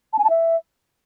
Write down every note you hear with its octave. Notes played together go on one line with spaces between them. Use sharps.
A5
G#5
A5
E5